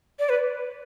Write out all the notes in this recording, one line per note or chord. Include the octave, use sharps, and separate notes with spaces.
D5
B4